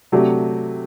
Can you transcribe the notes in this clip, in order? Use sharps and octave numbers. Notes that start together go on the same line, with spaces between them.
C3 F#3 A3 D4 G4